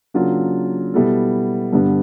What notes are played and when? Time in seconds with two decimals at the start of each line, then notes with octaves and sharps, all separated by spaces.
0.14 C#3 F#3 A#3 D4 F4
0.94 B2 G3 B3 E4 A4
1.73 G2 D3 G3 B3 D4